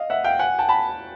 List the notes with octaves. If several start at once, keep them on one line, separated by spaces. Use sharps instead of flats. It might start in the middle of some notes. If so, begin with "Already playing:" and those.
Already playing: D#5 F5
E5 F#5
F5 G5
F#5 G#5
G5 A5
A5 B5